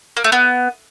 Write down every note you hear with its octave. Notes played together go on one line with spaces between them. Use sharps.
A#3
A3
B3